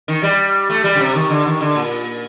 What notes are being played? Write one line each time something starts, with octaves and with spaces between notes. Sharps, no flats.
D#3
G3
A3
G3
D3
C3
D#3
D3
D#3
D3
A#2